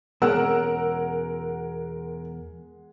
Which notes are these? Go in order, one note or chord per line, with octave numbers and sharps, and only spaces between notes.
E2 B2 G#3 C#4 A#4 F#5 E6